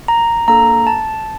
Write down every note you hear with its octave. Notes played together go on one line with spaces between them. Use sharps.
A#5
A#3 D4 A4 A#5
A5